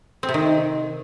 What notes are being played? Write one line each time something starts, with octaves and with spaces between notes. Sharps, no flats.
C4
C3
D#3